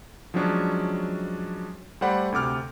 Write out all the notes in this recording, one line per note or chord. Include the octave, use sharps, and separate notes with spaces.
F3 F#3 G#3 C#4 D4
G3 A3 C5 D5 F#5 B5
D2 C3 D6 F6